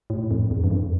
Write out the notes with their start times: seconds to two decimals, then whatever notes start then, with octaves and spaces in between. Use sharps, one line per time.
0.10 A2
0.31 F2
0.51 E2
0.64 G2
0.71 F2